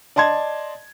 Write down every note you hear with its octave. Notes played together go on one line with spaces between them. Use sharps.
D5 D#5 A5 C6 G#6